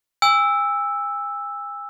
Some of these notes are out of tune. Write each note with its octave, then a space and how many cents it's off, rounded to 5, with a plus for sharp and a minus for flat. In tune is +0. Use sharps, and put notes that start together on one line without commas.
G#5 -40 E6 +0